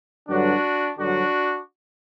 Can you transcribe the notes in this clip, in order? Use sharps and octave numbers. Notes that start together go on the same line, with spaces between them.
G2 D3 F#3 D4 F#4
G2 D3 F#3 D4 F#4